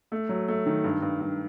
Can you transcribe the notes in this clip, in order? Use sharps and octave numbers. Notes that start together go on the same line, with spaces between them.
A3
F#3
A3
D#3
G2
G2
G2